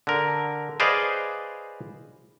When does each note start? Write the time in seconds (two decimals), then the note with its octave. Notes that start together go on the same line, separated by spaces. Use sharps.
0.07 D3 A#4
0.80 G#4 B4 C5 D5 D#5 F5